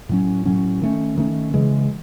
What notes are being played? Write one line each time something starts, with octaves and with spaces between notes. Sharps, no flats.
A2 F#3 C#4
A2 F#3 C#4
D#3 A3 C#4
D#3 A3 C#4
C#3 E3 G#3